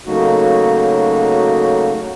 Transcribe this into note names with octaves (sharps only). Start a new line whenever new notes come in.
C#3 F#3 A3 A#3 D#4 F#4